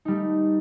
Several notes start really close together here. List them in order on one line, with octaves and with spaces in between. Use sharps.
D#4 G3 A3